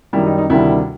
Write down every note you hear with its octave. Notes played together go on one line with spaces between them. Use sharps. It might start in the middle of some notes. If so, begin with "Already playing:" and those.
F#2 D#3 G3 E4
D#4
D#4
D2 C3 D#3 G3 E4